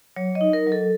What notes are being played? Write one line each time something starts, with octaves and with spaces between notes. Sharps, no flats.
F#3 C#5
D#5
D#4
A#4
F#3
A4